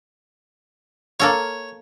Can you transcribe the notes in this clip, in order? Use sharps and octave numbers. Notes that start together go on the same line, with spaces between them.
A#3 A4 C#5 F5